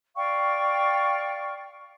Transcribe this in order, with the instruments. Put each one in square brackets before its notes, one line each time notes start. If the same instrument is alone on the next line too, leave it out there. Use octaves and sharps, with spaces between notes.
[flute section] D5 F5 G5 C#6